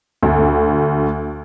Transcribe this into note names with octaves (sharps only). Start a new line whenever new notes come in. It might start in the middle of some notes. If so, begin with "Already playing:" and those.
D2